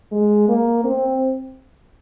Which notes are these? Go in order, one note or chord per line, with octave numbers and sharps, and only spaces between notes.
G#3
A#3
C4